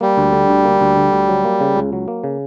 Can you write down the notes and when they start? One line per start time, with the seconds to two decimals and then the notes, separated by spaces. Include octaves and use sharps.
0.01 G3 A#3
0.17 D2
0.33 D3
0.49 D2
0.65 A#3
0.81 D2
0.97 D3
1.12 D2
1.28 F#3
1.45 A#3
1.61 C#3
1.76 C#2
1.93 F#3
2.08 A#3
2.24 C#3